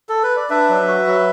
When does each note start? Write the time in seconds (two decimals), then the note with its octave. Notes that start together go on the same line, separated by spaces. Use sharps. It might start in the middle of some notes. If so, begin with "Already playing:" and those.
0.09 A4
0.23 B4
0.36 D5
0.50 D4 B4 E5
0.69 F#3
0.88 F#4
1.07 F#3